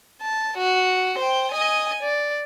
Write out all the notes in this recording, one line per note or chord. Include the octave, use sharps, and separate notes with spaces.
A5
F#4
C5 G5
D#5 G#5
D5